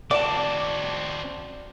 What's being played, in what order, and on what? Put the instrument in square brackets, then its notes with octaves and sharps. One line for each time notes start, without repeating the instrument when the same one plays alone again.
[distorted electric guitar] C4 F#4 [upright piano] D5 [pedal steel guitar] A5 D6